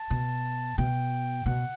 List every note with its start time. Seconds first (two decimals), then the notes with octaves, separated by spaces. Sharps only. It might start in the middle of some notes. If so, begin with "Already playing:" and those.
Already playing: A5
0.10 B2
0.78 B2 G5
1.46 B2 F#5